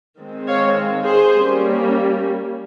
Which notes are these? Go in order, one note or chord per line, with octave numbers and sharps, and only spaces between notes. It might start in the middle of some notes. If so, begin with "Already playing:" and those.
D#3 G#3 C4
C#5 F5
G#4 C5
G3 A#3 C#4